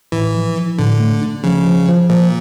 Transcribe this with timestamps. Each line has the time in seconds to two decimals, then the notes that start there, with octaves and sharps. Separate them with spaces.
0.12 A2 E3
0.35 F3
0.56 F3
0.78 A2 D3
1.00 A3
1.21 D4
1.44 C#3 F3
1.66 F3
1.88 F3
2.10 A#2 F3